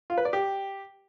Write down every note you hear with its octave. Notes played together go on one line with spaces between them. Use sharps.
F4
B4
D5
G4